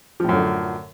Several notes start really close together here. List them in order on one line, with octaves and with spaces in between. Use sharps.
F3 A2 F#2 D3